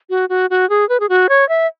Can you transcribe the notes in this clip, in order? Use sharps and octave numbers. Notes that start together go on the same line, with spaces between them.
F#4
F#4
F#4
G#4
B4
G#4
F#4
C#5
E5